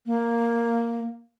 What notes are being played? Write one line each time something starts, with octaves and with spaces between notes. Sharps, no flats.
A#3